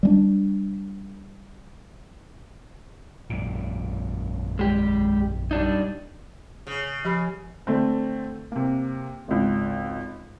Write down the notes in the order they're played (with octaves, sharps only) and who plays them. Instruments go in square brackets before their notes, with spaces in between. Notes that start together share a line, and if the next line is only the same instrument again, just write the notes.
[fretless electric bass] G3 G#3 D4
[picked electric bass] A#1 F#2 A#2
[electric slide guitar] G#3 G4
G3 D4 D#4
[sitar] C#3
[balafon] F3 G4 B5
[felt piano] D3 A3 C4
C3 A#3
G#1 C#2